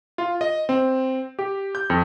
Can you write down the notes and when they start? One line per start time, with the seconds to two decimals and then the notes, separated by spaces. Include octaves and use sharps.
0.18 F4
0.41 D#5
0.69 C4
1.39 G4
1.75 G6
1.90 F2